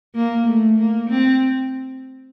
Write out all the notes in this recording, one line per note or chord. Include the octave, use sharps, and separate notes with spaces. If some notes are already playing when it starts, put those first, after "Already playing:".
A#3
A3
A#3
C4